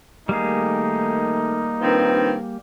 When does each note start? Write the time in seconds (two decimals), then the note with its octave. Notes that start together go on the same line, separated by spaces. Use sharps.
0.29 D#3 G3 A3 A#3 D#4 G#4
1.81 D#3 F3 C4 D4 B4